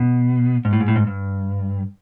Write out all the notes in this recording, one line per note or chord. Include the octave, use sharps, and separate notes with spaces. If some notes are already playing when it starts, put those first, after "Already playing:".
Already playing: B2
G#2
A2
G#2
A2
G#2
G2